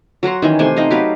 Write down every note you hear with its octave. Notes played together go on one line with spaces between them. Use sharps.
F#3 F#5 A#5 C6
D#3 E3 C#4
C3 A3 G#5 C6
C4 D#4 D#5 F5
F#3 G4 B4 F5